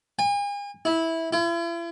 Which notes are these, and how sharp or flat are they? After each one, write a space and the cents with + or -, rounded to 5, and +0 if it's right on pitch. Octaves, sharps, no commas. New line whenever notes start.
G#5 -40
E4 -10
E4 +45